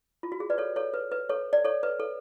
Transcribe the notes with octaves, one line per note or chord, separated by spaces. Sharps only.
F4
F#4
G#4
B4 D5
A4 C#5
A4 C#5
B4
B4
A4 C#5
D5
A4 C#5
B4
A4